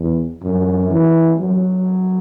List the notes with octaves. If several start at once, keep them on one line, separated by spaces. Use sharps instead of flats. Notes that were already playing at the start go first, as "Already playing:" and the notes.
Already playing: E2
F#2
E3
F#3